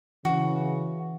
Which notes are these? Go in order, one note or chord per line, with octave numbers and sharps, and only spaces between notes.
C#3 E3 F#4